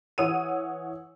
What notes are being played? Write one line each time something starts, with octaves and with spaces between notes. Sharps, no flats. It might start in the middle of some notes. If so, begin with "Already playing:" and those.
E3 C#5 F#5 D#6 E6 D#7